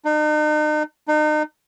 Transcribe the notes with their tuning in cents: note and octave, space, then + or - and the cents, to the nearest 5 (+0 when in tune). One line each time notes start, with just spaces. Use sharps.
D#4 -40
D#4 -35